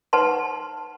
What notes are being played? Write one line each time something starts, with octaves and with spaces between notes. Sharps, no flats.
D#4 B4 F#5 A5 C6